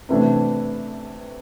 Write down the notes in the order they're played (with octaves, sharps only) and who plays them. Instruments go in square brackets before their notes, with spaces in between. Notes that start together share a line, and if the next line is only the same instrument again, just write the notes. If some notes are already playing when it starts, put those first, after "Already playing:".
[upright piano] C3 E3 A3 D4